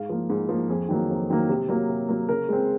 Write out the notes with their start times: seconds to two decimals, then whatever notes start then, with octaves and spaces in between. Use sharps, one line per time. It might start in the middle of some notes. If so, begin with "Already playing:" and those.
Already playing: G#2 F5
0.09 F3 A#3
0.30 G#2
0.49 F3 A#3
0.69 F2 G#4
0.89 D#3 F#3 A#3
1.10 F2
1.30 D#3 F#3 A#3
1.49 C3
1.69 F#3 A#3
1.89 C3
2.09 F#3 A#3
2.29 C#3 A#4
2.49 G#3 C4